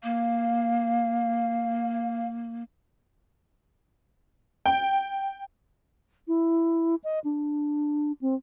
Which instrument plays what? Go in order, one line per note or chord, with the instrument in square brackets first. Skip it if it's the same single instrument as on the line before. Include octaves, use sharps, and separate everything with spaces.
[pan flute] A#3 [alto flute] F5
[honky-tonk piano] G5
[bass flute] E4
D#5
D4
C4